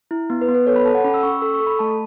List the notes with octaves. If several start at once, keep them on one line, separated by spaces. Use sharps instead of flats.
E4
B3
B4
B3
B4
A4 C#5
B5
A4 A5
F#5
C#4 B5
E6
C#4 C#6
A4 E6
C#6
A4
B5
A3 A5